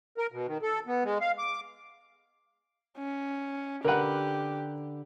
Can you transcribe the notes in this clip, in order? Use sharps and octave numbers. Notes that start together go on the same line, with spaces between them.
A#4
B2
D#3
A4
B3
G#3
F5
D6
C#4
D3 G4 A#4 B4 F#5